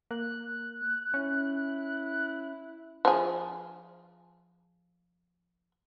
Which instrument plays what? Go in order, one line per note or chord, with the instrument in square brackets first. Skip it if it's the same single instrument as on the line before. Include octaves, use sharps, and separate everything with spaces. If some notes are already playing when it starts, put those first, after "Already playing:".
[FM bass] A#3 [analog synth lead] F#6
[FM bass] C#4 [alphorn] E4
[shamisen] F3 G#4